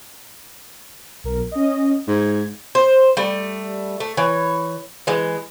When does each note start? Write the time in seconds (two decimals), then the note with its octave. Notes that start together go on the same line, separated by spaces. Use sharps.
1.24 B1 A#4
1.52 C#4 D#5
2.08 G#2 G#6
2.75 C5
3.17 G3 A3
4.00 A3
4.17 E3 C#5
5.07 E3 G#3